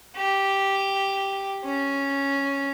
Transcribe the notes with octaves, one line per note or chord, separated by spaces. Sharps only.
G4
C#4